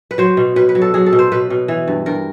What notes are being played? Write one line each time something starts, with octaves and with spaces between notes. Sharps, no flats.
B4
F#3 C5
B2
B2 B4
B4
F#3
A4
F#3 G#4
A4
B2
C5
B2 B4
B2
E3
G2
G2 A#4